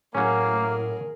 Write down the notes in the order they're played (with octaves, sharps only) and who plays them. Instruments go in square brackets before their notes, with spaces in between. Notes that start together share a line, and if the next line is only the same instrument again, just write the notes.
[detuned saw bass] A2 [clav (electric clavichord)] F#3 C#4 [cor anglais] A#3 [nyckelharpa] G#4 A#4